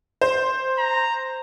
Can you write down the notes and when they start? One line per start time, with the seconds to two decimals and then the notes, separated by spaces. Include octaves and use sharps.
0.21 C5
0.78 A#5